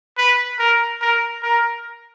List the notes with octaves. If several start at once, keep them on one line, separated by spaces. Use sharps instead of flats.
B4
A#4
A#4
A#4